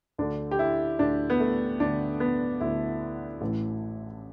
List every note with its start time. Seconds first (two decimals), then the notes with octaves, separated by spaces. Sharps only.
0.18 D2 D3 D4
0.51 G4
0.59 E4
0.99 D2 D3 D4
1.30 B3
1.40 A3
1.80 D2 D3 D4
2.20 B3
2.61 D2 D3 E4
3.41 A1 A2 E3